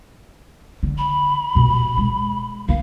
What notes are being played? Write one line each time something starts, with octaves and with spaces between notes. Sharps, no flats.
D3
B5
D#1 B2
G#3
D#3 A#3 F5